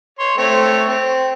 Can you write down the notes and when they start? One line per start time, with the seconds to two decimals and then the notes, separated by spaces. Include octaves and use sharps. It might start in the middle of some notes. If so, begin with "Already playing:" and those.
0.19 C#5 C6
0.38 A3 C4 C#5
0.87 C4